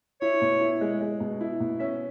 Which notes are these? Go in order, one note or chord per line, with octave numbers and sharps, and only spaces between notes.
E4 C#5
B2
E4
G#3
G#3
B2
E4
B2
C#4 E5